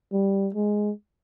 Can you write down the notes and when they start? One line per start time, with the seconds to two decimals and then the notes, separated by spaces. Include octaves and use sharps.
0.12 G3
0.54 G#3